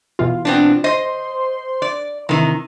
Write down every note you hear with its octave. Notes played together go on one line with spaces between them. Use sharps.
B2 E3 F4
B3 C4 D4
C5 D#5 C6
D5
C3 D#3 E3